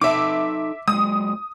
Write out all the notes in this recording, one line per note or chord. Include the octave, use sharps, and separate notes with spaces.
D#4 A4 E5 A5 D6
F#3 G#3 D#6